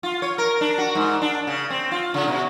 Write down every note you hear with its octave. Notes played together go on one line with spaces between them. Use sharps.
F4
C#5
A#4
D4
F#4
G#2
D4
C#3
C4
F4
C#3
B2